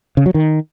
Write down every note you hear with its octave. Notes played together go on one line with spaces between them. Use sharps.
C#3
F#3
D#3